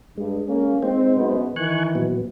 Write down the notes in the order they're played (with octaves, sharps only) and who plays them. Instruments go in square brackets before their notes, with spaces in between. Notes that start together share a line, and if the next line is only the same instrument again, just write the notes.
[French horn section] G2 [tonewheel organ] G#3
[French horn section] A#3 C#4
[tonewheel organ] G#3 D#4 C5 [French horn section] C4
[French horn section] F#2 B2 B3
[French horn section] D#3 E3 [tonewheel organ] G#5 C#6 F#6
[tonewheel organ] A#2 F#3 B3